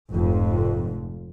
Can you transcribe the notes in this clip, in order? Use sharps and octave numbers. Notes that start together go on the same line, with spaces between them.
F1 F2 G#2